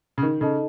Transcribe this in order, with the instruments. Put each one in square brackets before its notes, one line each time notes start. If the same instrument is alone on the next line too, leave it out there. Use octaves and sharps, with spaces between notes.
[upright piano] C#3
[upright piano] D#3 [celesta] D#4
[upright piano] C#3 [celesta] A4 D#5 A5